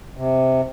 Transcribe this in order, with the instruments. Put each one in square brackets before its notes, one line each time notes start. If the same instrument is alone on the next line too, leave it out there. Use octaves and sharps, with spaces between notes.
[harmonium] C3